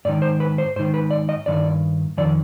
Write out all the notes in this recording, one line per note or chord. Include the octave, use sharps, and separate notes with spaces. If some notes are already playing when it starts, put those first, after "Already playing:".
G#2 D#3 D5
C5
B4
C5
G#2 D#3 C5
B4
D5
D#5
G2 D#3 D5
F2 D#3 D5